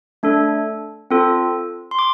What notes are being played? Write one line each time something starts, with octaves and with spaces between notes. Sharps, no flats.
A3 D4 A4
C4 F4 A4
C6
D6